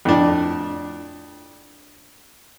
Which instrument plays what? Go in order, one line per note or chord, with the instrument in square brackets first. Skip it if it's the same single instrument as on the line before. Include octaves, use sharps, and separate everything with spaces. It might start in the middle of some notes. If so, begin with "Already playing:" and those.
[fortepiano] F2 A2 D4